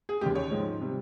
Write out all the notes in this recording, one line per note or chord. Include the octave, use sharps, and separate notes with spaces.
G#4
D#2 C#3 G#3 G4
C#5
G#2 F3 G#3
C3 G3